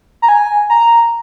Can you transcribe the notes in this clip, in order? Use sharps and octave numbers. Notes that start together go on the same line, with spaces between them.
A#5
G#5
A#5